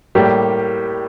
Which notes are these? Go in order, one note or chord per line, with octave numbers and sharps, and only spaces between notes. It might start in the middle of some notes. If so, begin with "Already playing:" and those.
A2 G3 A#3 G4